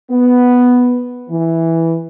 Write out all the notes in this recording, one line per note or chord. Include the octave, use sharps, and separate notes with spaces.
B3
E3